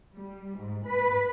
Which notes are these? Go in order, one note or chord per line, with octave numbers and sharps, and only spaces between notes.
G3
G#2
B4